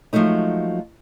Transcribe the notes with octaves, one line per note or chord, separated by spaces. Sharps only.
F3 F#3 G#3 A3 D#4